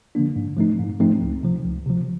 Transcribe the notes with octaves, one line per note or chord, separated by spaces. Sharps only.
D3 F3 A#3 D4
G#2
F3 A3 C4 D#4
G#2
F3 A3 C4 D#4
C#2
C3 F3
C#2
C3 F3